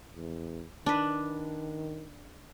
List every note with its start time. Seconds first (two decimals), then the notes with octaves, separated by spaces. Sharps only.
0.16 E2
0.86 D#3 D4 B4